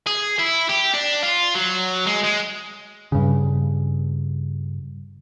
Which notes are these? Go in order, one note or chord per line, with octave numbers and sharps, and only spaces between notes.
G#4
E4
G4
D4
F4
F#3
G#3
G#3
G2 C#3